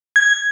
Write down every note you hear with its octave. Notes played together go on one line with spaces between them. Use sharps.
G#6